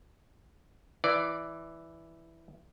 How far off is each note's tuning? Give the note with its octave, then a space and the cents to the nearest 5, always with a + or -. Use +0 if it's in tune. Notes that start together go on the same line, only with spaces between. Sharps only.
E3 +0 D5 +0